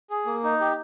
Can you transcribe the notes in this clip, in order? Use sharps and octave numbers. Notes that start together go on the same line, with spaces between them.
G#4
A#3
D#4
G4